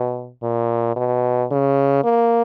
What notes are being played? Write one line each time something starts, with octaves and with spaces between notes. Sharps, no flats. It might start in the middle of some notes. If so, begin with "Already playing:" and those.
Already playing: B2
A#2
B2
C#3
A#3